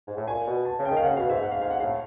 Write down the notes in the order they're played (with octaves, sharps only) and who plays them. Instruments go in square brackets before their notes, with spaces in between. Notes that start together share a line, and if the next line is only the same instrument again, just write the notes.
[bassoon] G#2
A2
[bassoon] A#2 [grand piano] G#5
[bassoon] B2
[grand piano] A5
[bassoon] C#3
[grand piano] G5
[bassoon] D#3
[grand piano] F5
[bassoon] C#3 [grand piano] F#5
[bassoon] B2 [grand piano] F5
[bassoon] G#2 [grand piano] E5
[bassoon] G#2 [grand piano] F#5
[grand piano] F5
[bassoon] G#2 [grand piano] F5
[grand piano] F#5
[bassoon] A2 [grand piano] F5